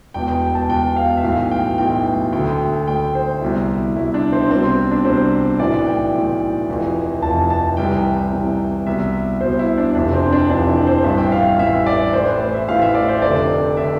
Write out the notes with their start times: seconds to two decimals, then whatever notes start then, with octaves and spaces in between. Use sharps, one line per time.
0.14 E1 E2 B2 G5
0.28 G5
0.42 G5
0.55 A5
0.69 E1 E2 B2 G5
0.96 F5
1.17 E5
1.24 B1 A2 E3 F5
1.51 G5
1.78 B1 A2 E3 G5
2.32 D2 D3 G5
2.87 D2 D3 G5
3.15 C5
3.41 C2 B2 E4
3.95 C2 B2 E4
4.14 D4
4.32 C4
4.50 C2 B2 C4
4.91 D4
5.05 C2 B2 C5
5.59 B1 A2 E3 D5
5.86 G5
6.14 B1 A2 E3
6.69 F1 F2 E3
7.22 F1 F2 E3 A5
7.50 A5
7.77 C2 C3 E3 G5
8.33 C2 C3 E3
8.86 C2 B2 E5
9.41 C2 B2 C5
9.59 E4
9.78 D4
9.95 F1 F2 C3 E3 D4
10.13 C4
10.32 D4
10.50 F1 F2 C3 E3 D4
10.68 E4
10.87 C5
11.04 A1 G2 E3 E5
11.18 G5
11.32 F5
11.45 F5
11.59 A1 G2 E3 E5
11.86 D5
12.13 A1 A2 E3 C5
12.26 B4
12.41 C5
12.54 E5
12.69 A1 A2 E3 F5
12.82 E5
12.95 D5
13.09 C5
13.22 F1 F2 D3 D5
13.77 D3 E5